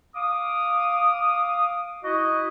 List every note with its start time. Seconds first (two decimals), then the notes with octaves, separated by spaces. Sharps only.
0.15 F5 D6 D#6
2.04 E4 F#4 D#5